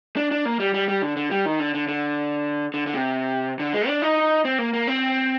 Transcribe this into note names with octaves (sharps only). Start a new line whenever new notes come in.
D4
D4
A#3
G3
G3
G3
D3
D3
G3
D#3
D3
D3
D3
D3
D3
C3
D3
G#3
D4
D#4
C4
A#3
A#3
C4